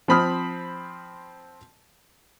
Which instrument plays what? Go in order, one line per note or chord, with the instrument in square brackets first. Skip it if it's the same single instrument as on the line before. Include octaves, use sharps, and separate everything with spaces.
[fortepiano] F3 C4 B5 D#6 F6